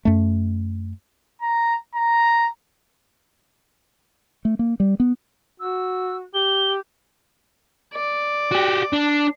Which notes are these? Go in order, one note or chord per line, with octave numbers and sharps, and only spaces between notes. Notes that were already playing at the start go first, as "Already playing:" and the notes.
F#2 A3
A#5
A#5
A3
A#3
G3
B3
F#4 E6
G4 G7
D5
F#4 G4
D4